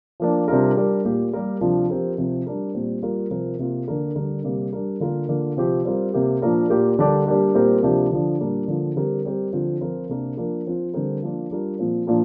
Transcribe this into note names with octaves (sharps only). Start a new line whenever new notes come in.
F3 A#3 D4
C3 G3 D4 F4 A#4
G3 D4 G4 A#4
A#2 A#3 G4
G3 A#3 G4 A#4
C3 F3 D4 F4
F3 C4 G4 A#4
C3 F3 C4
G3 D4 A#4
A#2 G3 C4
G3 A#3 F4 A#4
C3 F3 C4 A#4
C3 A#3 F4
D3 A#3 D4 A#4
D3 G3 D4 A#4
C3 G3 A#3
G3 D4 A#4
D3 A#3 F4 A#4
D3 A#3 F4
C3 F3 C4 G4
G3 C4 F4 A#4
C3 A#3 G4
A#2 F3 A#3 D4 A#4
A#2 A#3 G4 A#4
D3 G3 D4 G4 A#4
G3 A#3 D4 G4 A#4
A#2 G3 C4 G4 A#4
C3 F3 A#3 D4 G4
D3 F3 D4
A#2 G3 D4 A#4
D3 F3 A#3
D3 G3 C4 G4 A#4
G3 C4 G4 A#4
D3 F3 C4 F4
F3 C4 F4 A#4
C3 A#3 D4 A#4
F3 A#3 D4 A#4
F3 C4 F4
D3 G3 C4 A#4
F3 A#3 D4 F4
G3 D4 F4 A#4
A#2 F3 C4
A#2 F3 D4 A#4